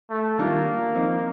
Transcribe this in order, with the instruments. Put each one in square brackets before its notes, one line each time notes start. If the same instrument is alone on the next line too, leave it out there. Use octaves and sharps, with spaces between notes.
[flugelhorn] A3
[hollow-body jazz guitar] D#3 G3 D4 F4 [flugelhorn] A#3
[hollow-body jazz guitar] F3 C4 D#4